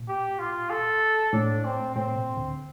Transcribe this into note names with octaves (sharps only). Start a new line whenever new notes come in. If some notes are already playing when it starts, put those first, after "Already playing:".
Already playing: A#2
G4
F4
A4
A2 D4
C4
A2 C4
A#2
D2 D3